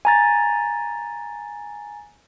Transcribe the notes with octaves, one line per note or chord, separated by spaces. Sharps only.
G#5 A#5 A6